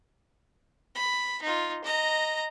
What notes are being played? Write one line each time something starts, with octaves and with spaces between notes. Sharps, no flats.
B5
D#4 F4
D#5 A#5